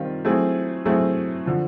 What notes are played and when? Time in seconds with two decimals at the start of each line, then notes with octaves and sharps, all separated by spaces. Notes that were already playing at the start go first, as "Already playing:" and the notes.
Already playing: D#3 G3 C4 F4
0.25 F#3 A3 C4 E4 G#4
0.85 F#3 A3 C4 E4 G#4
1.46 D3 F3